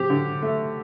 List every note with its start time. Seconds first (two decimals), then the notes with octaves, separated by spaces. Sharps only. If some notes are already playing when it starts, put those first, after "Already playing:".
Already playing: F#3 C4 G4
0.10 D3
0.42 A3